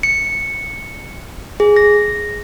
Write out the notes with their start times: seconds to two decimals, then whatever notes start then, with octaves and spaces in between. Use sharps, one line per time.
0.03 C#7
1.60 G#4
1.76 A#6